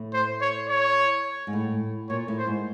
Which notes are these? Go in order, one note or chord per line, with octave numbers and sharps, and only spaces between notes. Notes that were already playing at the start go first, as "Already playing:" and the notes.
Already playing: A2
C5
C#5
C#5
G#2
A2
A#2 C#5
A2
C5
G#2